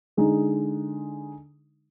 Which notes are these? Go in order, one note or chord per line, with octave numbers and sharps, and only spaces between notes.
D3 G#3 D#4